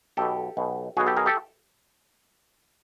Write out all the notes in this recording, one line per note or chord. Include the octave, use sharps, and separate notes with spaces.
B1 B2 G4 A4
B1 B2
B1 B2 F#4 G#4
G4 A4
G#4 A#4
G4 A4